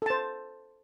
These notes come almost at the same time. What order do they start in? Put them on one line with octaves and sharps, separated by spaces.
A4 A5 C5